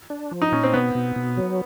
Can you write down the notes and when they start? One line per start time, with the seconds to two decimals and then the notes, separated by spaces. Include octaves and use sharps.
0.10 D4
0.31 F3
0.42 D#4
0.52 A#2 C#4
0.63 C4
0.74 B2 B3
0.95 B2
1.16 B2
1.37 F#3